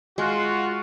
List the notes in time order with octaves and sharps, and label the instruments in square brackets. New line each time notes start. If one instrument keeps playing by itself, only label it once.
[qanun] G#3 [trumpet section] F4 F#4